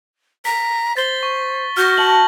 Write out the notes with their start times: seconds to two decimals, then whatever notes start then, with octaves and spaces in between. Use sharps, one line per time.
0.45 A#5 B6
0.97 C5 A6 G7
1.23 C#6
1.77 F#4 F6 G6 A#6
1.98 A5 F#7